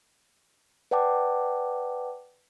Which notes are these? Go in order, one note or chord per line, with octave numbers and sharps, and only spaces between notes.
B4 D5 F#5 G5 A5 D6